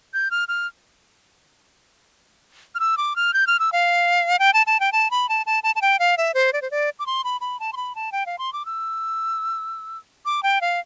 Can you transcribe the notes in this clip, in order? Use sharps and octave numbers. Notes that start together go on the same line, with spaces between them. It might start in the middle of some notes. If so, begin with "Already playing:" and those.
G6
F6
F6
F6
E6
D6
F6
G6
F6
E6
F5
G5
A5
A5
G5
A5
B5
A5
A5
A5
A5
G5
F5
E5
C5
D5
C5
D5
D6
C6
B5
B5
A5
C6
B5
A5
G5
F5
C6
D6
E6
D6
G5
F5